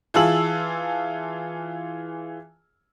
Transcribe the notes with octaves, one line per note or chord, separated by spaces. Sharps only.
E3 F4 G#4 A5 E6 F#7